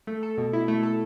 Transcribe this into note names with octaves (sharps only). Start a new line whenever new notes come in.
A3
A4
B2
E4
A3
A4